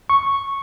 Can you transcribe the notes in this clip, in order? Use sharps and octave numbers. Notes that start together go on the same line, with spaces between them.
C#6